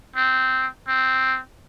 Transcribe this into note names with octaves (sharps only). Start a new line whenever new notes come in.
C4
C4